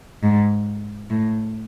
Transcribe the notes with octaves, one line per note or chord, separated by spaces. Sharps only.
G#2
A2